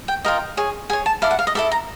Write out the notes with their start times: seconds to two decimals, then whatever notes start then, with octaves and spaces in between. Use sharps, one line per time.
0.08 G5
0.24 F4 A#4 D#5 G5
0.57 G#4 C#5
0.90 G#4 C#5 G#5
1.06 A5
1.22 E4 A4 D5 F5
1.31 F#5
1.39 F5
1.47 D#5
1.55 E4 A4 D5 E5
1.71 A#5